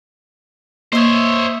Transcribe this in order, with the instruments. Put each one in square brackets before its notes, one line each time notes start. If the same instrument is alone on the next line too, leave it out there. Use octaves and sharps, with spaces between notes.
[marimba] A#3 [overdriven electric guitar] C5 C#5 [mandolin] D#5 E5